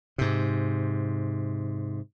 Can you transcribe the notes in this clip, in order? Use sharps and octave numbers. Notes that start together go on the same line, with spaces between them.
G#2 C3